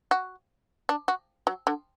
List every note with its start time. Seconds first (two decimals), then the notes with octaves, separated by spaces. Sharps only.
0.11 F#4
0.89 D4
1.08 F#4
1.47 F#3
1.67 D3